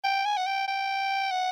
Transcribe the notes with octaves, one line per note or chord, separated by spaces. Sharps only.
G5
G#5
F#5
G5
G5
F#5